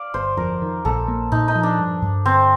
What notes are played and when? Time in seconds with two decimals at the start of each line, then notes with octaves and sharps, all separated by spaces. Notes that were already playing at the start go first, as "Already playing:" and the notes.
Already playing: D5 F5
0.14 G1 C5
0.37 F2 A#4
0.62 D#3
0.85 A#1 A4
1.08 A#3
1.32 A#2 D#4
1.48 D#4
1.55 F3
1.63 D4
1.79 G2
2.02 G2
2.25 D3 C4